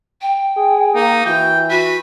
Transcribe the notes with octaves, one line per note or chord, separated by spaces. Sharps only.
G5
G#4
A#3 D#4
E3 F#4 G5
F#4 B4